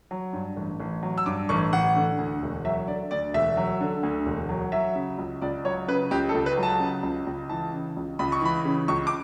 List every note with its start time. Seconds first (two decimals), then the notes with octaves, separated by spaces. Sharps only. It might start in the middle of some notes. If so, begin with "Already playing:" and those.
0.11 F#3
0.33 G2
0.56 A1
0.80 A1
1.03 F#3
1.18 E6
1.26 G2 D6
1.49 A1 C#6
1.72 A1 F#5
1.95 D3
2.18 D2
2.42 E1
2.65 F#3 E5
2.87 D3 D5
3.11 D2 D5
3.34 E1 E5
3.57 F#3
3.81 D3
4.03 D2
4.26 E1
4.49 F#3
4.72 F#3 E5
4.95 C#3
5.18 C#2
5.42 C#2 D5
5.65 F#3 C#5
5.88 C#3 B4
6.11 C#2 G4
6.29 A4
6.34 C#2
6.46 B4
6.57 F#3
6.63 A5
6.80 C#3
7.03 C#2
7.27 C#2
7.50 E3 A5
7.73 C#3
7.96 C#2
8.19 C#2 B5
8.32 C#6
8.41 E3 B5
8.65 C#3
8.88 C#2 C#6
9.07 D6